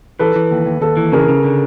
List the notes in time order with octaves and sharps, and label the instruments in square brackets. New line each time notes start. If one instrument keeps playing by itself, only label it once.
[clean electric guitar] E3 [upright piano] A4 B4
[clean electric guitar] E3
D#2
D#2
[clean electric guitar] D#2 [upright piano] A4 B4
[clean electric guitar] E3
[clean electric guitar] C#3 [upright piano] G#4 A#4
[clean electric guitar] C#3
D3